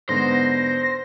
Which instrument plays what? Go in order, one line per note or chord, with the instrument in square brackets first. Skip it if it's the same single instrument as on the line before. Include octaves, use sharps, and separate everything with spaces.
[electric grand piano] G#2 D3 B3 [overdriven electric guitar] C5 [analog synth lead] A#6